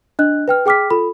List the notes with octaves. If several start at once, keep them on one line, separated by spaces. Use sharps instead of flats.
D4 D#5 F#6
B4 G5 F6
G#4 G5 D6 F6 B6
F4 A4 B5